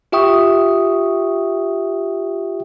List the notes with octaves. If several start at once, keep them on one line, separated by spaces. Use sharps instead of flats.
F4 G4 E5 G5 C#6 D#6